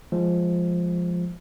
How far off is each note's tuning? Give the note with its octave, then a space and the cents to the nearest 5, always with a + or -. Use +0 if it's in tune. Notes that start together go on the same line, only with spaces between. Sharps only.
F3 +0 G#3 +0